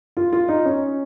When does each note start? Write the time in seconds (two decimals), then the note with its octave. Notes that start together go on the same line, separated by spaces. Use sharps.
0.17 F4
0.33 F4
0.49 D#4
0.65 C#4